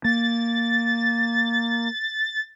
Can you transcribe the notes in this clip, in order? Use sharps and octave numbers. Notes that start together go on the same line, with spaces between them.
A#3 A6